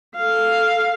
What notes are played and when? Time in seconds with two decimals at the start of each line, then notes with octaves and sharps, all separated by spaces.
0.16 A4 F5